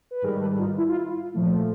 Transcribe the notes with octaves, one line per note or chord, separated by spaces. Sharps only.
B4
G#2 D#3 G3 G#4 A#4
A4 B4
D#4 F4
E4
F4
E4
A#2 F3 A3